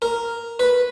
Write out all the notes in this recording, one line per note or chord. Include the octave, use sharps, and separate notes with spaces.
A#4
B4